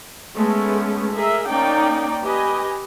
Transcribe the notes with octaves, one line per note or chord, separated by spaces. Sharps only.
G#3 A3 B3 C#4
G#4 A#4 D#5 E5
A#3 C#4 D#4 D5 G5
G4 B4 D#5 G#5